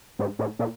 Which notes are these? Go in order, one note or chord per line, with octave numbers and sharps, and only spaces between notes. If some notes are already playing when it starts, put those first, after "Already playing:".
G#2
A2
A#2